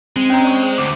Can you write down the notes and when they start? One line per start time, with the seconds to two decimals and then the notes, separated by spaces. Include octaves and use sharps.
0.16 G#3 C4
0.30 C#4 C#5 A#5
0.44 D5 C#6
0.78 D2 D6